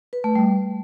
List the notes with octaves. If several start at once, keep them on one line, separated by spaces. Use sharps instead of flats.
B4
A3
G3